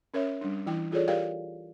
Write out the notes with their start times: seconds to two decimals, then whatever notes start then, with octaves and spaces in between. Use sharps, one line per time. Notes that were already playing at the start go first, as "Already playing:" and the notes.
0.14 C#4 A#4 C#5 E5
0.41 G3 D4
0.66 E3 E4 G5
0.92 F4 G#4 A4 C#5 D5
1.08 G4 A#4 D5 F5 G5